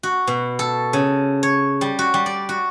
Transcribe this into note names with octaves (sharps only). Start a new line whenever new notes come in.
F#4
B2
A4
C#3
C#5
G3
F#4
G3
D5
F#4